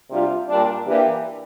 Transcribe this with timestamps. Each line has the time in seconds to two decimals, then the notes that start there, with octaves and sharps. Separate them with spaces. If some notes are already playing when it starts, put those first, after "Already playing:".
0.11 C3 G3 D4 F4
0.48 A#2 G3 D4
0.86 E3 A#3 D4 G4